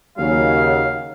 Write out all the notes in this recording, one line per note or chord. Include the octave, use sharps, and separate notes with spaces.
D#2 C#3 F#3 F5